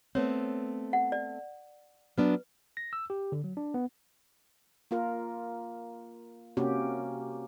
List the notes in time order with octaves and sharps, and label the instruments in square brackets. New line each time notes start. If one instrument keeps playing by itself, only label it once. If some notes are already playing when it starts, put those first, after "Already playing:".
[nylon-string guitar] A3 B3 C4 [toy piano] C#5
[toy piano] F#5
D5
[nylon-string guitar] F#3 B3 D4 [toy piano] B4
[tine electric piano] A#6
E6
G4
D3
F#3
D4
B3
[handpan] A#3 F4 A#4
C3 A#3 C#4 F#4 G4